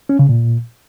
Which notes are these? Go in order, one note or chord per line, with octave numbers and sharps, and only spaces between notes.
C#4
C#3
A#2